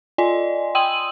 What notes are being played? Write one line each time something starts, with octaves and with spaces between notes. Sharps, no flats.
F4 D5 D#5 G#5 C6
G5 C6 D#6 E6 D#7 F#7